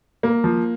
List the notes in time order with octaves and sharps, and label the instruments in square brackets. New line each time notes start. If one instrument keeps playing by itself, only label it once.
[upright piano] A#3
F3